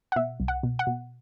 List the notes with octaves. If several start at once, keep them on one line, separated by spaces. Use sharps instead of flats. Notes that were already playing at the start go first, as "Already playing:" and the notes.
F#5
B2 E5
C2
F#5
B2
F#5
B2